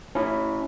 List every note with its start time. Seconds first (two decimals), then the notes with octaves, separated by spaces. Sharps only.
0.15 C#4 E4